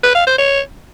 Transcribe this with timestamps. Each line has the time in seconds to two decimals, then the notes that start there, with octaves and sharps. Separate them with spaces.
0.03 B4
0.15 F5
0.27 C5
0.38 C#5